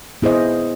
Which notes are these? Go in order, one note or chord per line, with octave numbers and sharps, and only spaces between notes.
B3 E4 G#4 C5 D#5